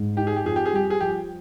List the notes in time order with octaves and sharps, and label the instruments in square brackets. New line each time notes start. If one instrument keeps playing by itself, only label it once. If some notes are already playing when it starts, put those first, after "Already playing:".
Already playing: [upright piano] G#2
[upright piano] D#4 [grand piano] G4
[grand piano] G#4
G4
[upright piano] F2 [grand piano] G#4
[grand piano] G4
G#4
[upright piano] G3 [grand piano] G4
[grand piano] G#4
[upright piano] F3 [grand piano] G4